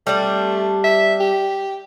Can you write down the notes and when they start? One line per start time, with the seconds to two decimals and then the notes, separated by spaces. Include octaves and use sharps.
0.07 G3 A3 C4 D4
0.84 E5
1.20 G4